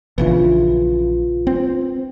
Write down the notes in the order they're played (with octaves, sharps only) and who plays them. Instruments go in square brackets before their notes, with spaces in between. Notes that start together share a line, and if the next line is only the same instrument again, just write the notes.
[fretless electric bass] A#1 C#3 E3 [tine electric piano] F4 B4
[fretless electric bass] C4